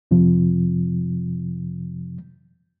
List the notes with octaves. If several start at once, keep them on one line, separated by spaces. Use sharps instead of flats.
F2 C3 F3